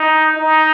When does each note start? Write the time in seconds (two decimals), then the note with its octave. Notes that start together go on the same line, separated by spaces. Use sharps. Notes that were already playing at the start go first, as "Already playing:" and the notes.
Already playing: D#4
0.37 D#4